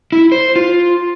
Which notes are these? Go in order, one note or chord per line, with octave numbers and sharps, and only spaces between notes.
E4
C5
F4